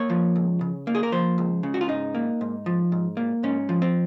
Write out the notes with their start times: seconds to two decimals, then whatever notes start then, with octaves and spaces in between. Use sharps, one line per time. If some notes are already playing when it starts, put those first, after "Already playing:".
Already playing: A#3 C#5
0.10 F3
0.36 C#2
0.61 C#3
0.87 A#3
0.95 G#4
1.03 A#4
1.12 F3 C5
1.38 C#2
1.63 C#3
1.74 F#4
1.81 F4
1.89 G#2 D#4
2.15 A#3
2.41 G#2
2.66 F3
2.92 G#2
3.17 A#3
3.43 G#2 C#4
3.69 F3
3.82 C4